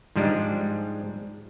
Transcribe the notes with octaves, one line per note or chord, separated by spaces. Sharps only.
G#2 F3 G3 G#3 D4